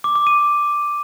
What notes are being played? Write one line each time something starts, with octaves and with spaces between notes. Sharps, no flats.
D6
D6
D#7